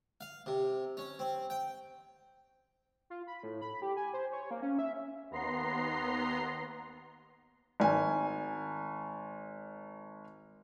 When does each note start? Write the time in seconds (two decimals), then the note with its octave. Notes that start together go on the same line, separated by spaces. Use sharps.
0.21 F5
0.46 C3
0.97 C#4
1.19 C4
1.50 G5
3.10 F4
3.27 B5
3.43 A2
3.61 B5
3.82 G4
3.97 G#5
4.13 C5
4.32 C#5
4.51 A#3
4.62 C#4
4.79 E5
5.30 D#2 B3 A#5 C6 C7
7.80 G#1 G#5